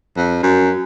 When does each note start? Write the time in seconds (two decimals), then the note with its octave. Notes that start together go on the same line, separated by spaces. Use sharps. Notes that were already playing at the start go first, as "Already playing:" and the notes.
0.17 F2
0.43 F#2